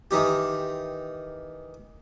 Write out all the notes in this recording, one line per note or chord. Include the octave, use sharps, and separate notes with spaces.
D#3 E3 D#4 G4